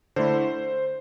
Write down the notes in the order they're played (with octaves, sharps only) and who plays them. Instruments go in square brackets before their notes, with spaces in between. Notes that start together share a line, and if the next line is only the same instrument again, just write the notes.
[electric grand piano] D3 A3 E4 C5